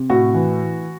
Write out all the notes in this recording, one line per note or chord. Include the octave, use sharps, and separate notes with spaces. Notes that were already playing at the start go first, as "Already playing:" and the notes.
Already playing: C3
A2 F#4
E3